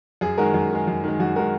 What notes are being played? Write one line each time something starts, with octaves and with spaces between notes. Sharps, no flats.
F#2 G#4
D#3 G#3 F#4 A#4
F#2
D#3 G#3
F#2
D#3 G#3
F#2 F#4
D#3 G#3 F#4 A#4